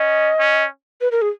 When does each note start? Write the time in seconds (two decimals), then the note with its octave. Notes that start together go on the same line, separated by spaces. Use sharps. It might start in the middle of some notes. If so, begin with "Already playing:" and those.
Already playing: C#4 D#5
0.39 C#4
1.01 B4
1.11 A#4
1.22 G#4